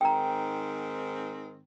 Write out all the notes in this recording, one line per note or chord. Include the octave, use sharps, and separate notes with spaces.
G#2 D#3 C4 G5 A#5